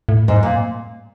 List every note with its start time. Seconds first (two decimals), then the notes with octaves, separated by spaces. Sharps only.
0.09 A2
0.28 G#2
0.43 A#2